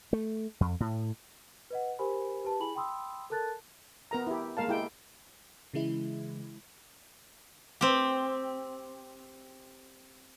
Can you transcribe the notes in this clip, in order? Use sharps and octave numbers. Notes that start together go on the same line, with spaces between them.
A3
F2
A2
B4 D#5 F#5
G4 A#4 C5 G#5 B5
G4 B4 A5
E4 G#4 G#5 B5 F#7
G5 B5 C6 D#6 E6
A4 A#4 A5 F#6 A6
B3 A#4 A#5
E4 G4
G#3 A#3 A#4 F5 A5
G#3 E4 G4 G5
C#3 E3 G#3 E4
C4 G4